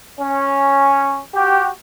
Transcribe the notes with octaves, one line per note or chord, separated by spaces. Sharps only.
C#4
F#4 G4